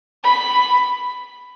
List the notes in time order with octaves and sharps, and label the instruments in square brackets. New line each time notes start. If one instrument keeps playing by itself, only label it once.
[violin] B5